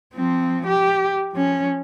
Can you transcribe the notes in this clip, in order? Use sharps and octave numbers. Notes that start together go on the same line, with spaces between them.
F3 C4
G4
F3 C#4